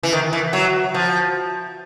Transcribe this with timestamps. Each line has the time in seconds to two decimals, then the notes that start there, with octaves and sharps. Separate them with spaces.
0.03 E3
0.13 D#3
0.33 E3
0.53 F#3
0.94 F3